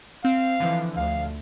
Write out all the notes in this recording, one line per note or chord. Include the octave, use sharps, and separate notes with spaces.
C4 F5
D3 E3 F3
D2 F5